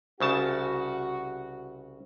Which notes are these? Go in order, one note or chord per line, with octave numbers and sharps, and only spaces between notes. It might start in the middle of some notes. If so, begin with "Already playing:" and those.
C2 C#3 F#4 A5